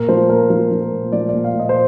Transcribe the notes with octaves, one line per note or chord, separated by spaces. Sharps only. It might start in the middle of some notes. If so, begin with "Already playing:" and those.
Already playing: A#2 A#4
F3 C5
A#2 A#4
F3 A#4
F3
A#4
A#2
F3 D5
A#2 D5
F5
A#2
D#5
C5